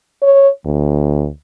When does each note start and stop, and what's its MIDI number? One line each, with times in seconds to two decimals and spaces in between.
0.22 0.48 73
0.65 1.28 38